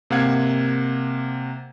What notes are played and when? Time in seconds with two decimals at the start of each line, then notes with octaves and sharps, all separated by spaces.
0.10 C3 A#3 F5 F#5 G#6